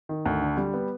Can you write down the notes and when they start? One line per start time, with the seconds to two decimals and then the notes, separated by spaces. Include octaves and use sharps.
0.09 D#3
0.26 D2
0.42 D3
0.57 G3
0.74 B3